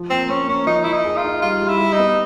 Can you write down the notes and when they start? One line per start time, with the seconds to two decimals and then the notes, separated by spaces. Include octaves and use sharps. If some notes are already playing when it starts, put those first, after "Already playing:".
Already playing: F3
0.10 A#3 C4
0.29 A#3 C#4
0.48 A#3 C#4
0.67 F3 D#4
0.84 F3 E4
0.93 D#4
1.05 G#4
1.17 F4
1.24 D#4
1.42 G3 F4
1.62 G3
1.68 E4
1.81 G3
1.93 D#4
1.99 B3